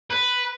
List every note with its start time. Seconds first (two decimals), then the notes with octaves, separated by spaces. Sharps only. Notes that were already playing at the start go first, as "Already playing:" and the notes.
0.10 B4